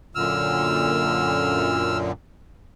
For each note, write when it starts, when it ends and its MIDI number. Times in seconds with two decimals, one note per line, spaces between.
0.15 2.12 42
0.15 2.12 46
0.15 2.12 50
0.15 1.97 88
0.15 1.97 89